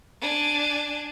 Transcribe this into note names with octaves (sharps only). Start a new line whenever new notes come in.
D4 G#5